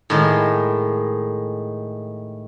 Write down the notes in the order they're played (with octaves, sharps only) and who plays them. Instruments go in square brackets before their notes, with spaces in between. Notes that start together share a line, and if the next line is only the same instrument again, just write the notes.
[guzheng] A2 D#3 G#3